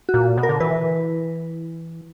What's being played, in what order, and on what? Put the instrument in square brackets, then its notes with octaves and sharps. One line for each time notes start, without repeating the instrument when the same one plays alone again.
[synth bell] F#4
[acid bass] A#2
B2
[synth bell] A#4
[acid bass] D3
[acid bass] E3 [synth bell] B4